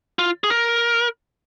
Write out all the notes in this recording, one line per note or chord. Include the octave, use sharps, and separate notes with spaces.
F4
G#4
A#4